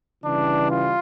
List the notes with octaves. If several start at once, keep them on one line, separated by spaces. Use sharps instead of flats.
C#3 E3 G3 D4
F4